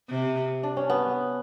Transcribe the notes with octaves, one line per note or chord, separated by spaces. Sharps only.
C3
D4
C#4
B3